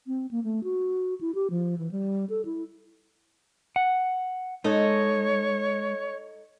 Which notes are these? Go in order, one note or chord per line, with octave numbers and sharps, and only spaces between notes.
C4
A#3
A3
F#4
E4
G4
F3
E3
G3
A4
E4
F#5
G#3 D#4 A4 C#5 D#5